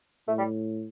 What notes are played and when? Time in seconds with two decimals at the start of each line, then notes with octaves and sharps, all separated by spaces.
0.28 A2 A3
0.38 G3